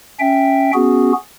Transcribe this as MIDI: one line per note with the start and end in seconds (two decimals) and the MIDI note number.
0.20 0.71 61
0.20 0.71 76
0.20 0.71 79
0.74 1.13 59
0.74 1.13 61
0.74 1.13 66
0.74 1.13 68